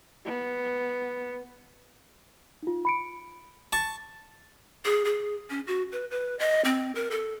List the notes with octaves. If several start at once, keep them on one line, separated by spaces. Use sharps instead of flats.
B3
D#4 F4
B5 C#7 D7
A5 C#6
G#4
G#4
C#4
F#4
B4
B4
D#5
C4
A#4
A4